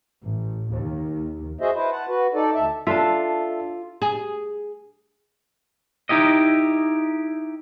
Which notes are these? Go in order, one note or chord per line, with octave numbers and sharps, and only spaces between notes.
A1
D#2
F#4 G#4 C5 D#5 E5
E4 B4 C5
F#5 A5
F#4 B4
D#4 A4 D5
D2 E5 A5
D4 F4 A4 E5 A5
G#4
D#4 E4 G4 D#5